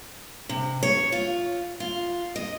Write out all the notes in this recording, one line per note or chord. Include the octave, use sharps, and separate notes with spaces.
C3
C#5
F4
F4
D#5